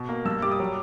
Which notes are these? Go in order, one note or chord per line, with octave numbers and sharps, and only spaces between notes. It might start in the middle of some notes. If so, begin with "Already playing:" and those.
Already playing: B2
A#3
G2 E6
G3 D6
D#6
F#3